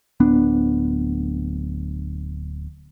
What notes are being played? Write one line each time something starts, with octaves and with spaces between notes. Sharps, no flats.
D1 B3 D4